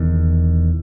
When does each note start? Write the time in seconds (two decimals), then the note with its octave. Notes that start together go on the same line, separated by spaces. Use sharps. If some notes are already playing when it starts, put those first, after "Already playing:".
Already playing: E1 E2 D#3